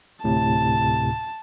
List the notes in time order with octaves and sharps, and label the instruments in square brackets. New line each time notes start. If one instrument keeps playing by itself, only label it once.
[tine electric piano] D2 A2 C3 [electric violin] A5